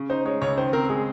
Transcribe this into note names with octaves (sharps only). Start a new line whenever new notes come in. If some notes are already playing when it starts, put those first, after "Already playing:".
Already playing: C#3
D#4 C5
G#3 C#5
C#2 C#5
D#3 C5
C4 A#4
G#3 G#4